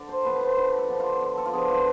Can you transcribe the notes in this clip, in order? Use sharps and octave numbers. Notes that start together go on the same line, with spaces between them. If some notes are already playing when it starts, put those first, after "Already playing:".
Already playing: D3 D5
C5
F3 B3 D4 B4
C5
D3 B4
A4
F3 B3 D4
F4
D3
A4
F4
F3 B3 D4 G#4
F4